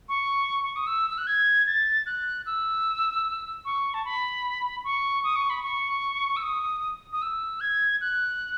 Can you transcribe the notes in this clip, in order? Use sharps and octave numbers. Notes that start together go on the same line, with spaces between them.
C#6
C#6
D#6
E6
E6
F#6
G#6
A6
F#6
E6
C#6
A5
B5
C#6
D#6
C#6
B5
C#6
E6
D#6
D#6
E6
G#6
F#6